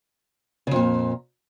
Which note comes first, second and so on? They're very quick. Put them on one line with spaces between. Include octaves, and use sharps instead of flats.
C#3 F2 A#2